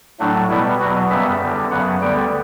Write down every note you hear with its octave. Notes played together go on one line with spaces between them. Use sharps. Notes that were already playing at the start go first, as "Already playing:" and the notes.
A2 F#3 A3 D4
B2 G3 B3 E4
E2 B2 F#3 B3 F#4
F#2 C#3 G3 B3 E5
E2 D3 G3
F#2 C#3 F#3 B3 F#5
D2 D3 G3 B3 G5